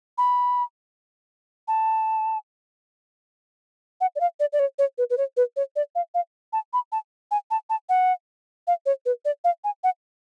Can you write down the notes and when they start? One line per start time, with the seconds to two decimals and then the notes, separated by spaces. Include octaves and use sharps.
0.18 B5
1.68 A5
4.01 F#5
4.16 D5
4.20 F5
4.40 D5
4.53 D5
4.59 C#5
4.79 C#5
4.98 B4
5.10 B4
5.18 C#5
5.37 B4
5.56 C#5
5.76 D5
5.95 F5
6.14 F5
6.53 A5
6.73 B5
6.92 A5
7.31 G#5
7.51 A5
7.70 A5
7.89 F#5
8.67 F5
8.86 C#5
9.06 B4
9.25 D5
9.44 F5
9.64 G#5
9.84 F#5